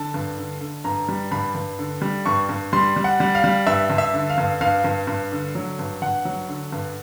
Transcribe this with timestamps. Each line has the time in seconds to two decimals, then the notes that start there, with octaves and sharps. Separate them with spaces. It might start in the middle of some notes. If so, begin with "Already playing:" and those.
Already playing: D3 A5
0.14 G2
0.38 D3
0.61 D3
0.84 G2 A#5
1.09 G3
1.31 G2 B5
1.55 G2
1.79 D3
2.02 G3
2.26 G2 C#6
2.49 G2
2.73 G3 C6
2.96 G3
3.04 F#5
3.20 G3
3.35 F5
3.44 G3
3.67 G2 E5
3.90 G2
3.98 E5
4.14 D3
4.30 F5
4.38 G2
4.61 G2 F5
4.84 G2
5.07 G2
5.32 D3
5.55 F#3
5.79 G2
6.02 G2 F#5
6.25 F#3
6.49 D3
6.72 G2